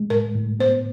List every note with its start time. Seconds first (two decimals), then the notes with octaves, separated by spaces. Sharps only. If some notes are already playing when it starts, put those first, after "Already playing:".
Already playing: G#3
0.10 A2 A#4
0.35 A2
0.59 B3 C5